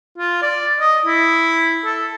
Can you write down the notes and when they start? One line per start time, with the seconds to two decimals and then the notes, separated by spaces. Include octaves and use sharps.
0.18 F4
0.42 D5
0.81 D#5
1.06 E4
1.85 A4